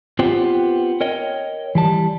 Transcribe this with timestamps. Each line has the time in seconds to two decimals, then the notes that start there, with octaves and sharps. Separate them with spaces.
0.19 B3 C4 F4 G4 B4 C5
1.01 A#4 C#5 D#5 G5
1.75 E3 G3 A5